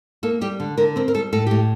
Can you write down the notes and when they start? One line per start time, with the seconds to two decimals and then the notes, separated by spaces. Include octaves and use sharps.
0.23 A#3 A4
0.41 G3 G4
0.60 D3
0.77 D3 A#4
0.96 C4 A#4
1.08 A#4
1.14 G3 A4
1.33 A2 A4
1.47 A2 G4